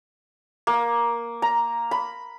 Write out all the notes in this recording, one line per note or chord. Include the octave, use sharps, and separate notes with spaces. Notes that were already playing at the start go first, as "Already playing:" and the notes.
A#3
A#5
B5